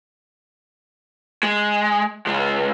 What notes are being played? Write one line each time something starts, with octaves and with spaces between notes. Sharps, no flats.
G#3
C#2 G#3